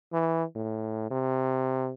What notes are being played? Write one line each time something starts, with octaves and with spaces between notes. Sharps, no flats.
E3
A2
C3